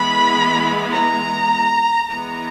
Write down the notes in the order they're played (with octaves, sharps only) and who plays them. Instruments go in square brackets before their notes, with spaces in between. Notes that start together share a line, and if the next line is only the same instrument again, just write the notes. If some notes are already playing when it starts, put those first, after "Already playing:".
Already playing: [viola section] E3 G#3 B3 B5
A#5
E3 G#3 B3 A#5